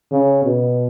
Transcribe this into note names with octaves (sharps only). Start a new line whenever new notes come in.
C#3
B2